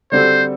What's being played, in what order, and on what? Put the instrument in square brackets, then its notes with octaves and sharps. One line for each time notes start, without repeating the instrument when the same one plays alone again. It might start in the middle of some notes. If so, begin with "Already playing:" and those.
[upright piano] D3 G3 C4 F#4 A4 [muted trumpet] C5